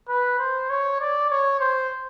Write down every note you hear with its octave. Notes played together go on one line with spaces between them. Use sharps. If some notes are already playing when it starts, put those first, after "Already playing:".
B4
C5
C#5
D5
C#5
C5